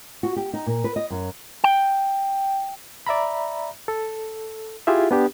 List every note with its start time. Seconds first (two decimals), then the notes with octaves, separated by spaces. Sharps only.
0.23 F#4
0.36 G4
0.53 D#4
0.67 A#2
0.84 B4
0.96 D#5
1.10 F#2
1.64 G5
3.07 D5 E5 A#5 B5
3.88 A4
4.87 E4 F4 G4 G#4 E5
5.11 B3 D4 G4